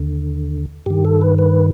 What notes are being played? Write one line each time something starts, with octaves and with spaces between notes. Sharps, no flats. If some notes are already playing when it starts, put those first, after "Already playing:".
Already playing: D#2 D3
G2 D#3 G4
A4
B4
B4